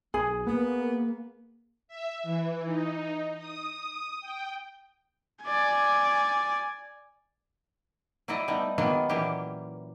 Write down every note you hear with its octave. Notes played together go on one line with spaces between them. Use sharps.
B1 G#4
A#3 B3
E5
E3
D#4
D#6
G5
D5 G#5
F#3 D#4 E4 D5 D#5 A#5
G3 A3 B3 D#4
D#3 F#3 G#3 A#3 B3 F4
A#2 E3 F#3 A#3 C#4 G4